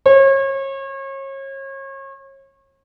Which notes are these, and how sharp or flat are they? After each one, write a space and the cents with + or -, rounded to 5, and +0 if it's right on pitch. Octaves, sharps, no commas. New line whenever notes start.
C#5 -35